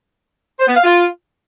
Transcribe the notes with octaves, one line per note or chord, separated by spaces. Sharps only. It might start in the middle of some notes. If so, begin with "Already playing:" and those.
C5
B3
F5
F4